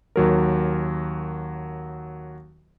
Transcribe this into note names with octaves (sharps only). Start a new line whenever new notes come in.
D#2 F#3 A#4